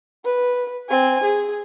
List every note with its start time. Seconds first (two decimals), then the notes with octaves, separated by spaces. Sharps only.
0.25 B4
0.90 C4 G#5
1.23 G#4